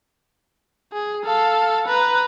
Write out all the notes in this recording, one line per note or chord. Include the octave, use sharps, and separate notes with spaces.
G#4
A4 F5
B4 A#5